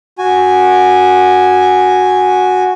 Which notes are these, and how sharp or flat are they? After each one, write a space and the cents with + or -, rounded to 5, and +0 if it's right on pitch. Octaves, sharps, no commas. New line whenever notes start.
F#4 -5 G#5 +0